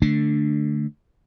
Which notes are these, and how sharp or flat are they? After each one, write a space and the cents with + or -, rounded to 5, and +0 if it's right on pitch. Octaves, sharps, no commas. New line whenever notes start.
D3 +10 A3 +0 D4 +0